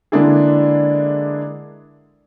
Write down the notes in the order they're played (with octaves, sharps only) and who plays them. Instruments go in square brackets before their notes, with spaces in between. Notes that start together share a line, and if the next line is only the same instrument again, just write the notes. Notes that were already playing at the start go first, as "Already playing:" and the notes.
[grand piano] D3 G#3 A#3 D4 E4 G#4